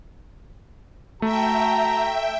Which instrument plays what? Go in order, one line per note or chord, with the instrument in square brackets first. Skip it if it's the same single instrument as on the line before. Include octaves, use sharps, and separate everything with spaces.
[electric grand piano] A3 [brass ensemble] F#4 A5 [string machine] E5 G5 [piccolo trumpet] A#5